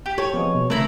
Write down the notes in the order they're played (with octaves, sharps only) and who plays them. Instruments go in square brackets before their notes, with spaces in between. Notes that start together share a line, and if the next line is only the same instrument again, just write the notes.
[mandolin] G4
[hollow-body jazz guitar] G4 A4 G5 [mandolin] C#5
[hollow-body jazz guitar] F3 G#4 D#5 [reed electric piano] B3 C4
[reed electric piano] B2
[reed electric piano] C#3 A#4 [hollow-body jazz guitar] A3 [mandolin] C4 E4 A#5